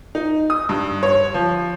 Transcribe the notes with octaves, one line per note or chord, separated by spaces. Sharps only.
D#4
D#6
G2
C#5
F3